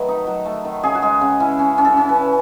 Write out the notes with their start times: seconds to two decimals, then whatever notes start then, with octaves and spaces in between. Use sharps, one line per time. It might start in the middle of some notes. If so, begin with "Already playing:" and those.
Already playing: D#3 F#3 A3 B4 C#5
0.08 D#4
0.27 F#3
0.46 A3
0.65 D#3
0.83 C#3 G#4
0.95 F#4
1.02 G#3 G#4
1.21 C#3
1.40 C#4 E4
1.59 C#4
1.78 C#4
1.85 A4
1.97 C#4
2.09 B4
2.15 C#4